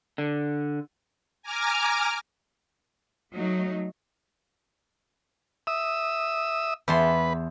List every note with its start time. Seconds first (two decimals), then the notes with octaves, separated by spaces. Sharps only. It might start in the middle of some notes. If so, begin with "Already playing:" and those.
0.18 D3
1.42 G#5 A#5 D6 F6
3.33 F#3 A3 D#4
5.67 E5 D#6 E6
6.88 E2 B4 A5 C6